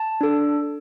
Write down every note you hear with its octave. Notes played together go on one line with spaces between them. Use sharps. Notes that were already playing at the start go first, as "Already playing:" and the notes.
Already playing: A5
D4 A4